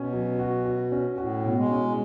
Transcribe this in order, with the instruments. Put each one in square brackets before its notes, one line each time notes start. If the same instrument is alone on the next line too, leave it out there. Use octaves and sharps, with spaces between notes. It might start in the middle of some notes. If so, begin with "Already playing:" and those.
Already playing: [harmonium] B2 [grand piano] C#4
[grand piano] F#3
F#4
F#4
C#4
[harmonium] A2 [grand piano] F#4
[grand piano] B2
[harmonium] G#3
[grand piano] C#4